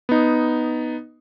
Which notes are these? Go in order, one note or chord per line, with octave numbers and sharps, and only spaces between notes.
B3 D#4